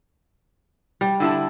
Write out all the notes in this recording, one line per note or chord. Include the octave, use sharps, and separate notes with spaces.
G3
D3 E4 A5